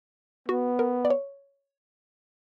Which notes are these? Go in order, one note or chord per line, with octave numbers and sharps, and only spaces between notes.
B3 F#4
A#4
D5
C#5